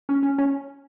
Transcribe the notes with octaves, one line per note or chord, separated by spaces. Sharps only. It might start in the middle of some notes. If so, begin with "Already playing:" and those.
C#4
C#4
C#4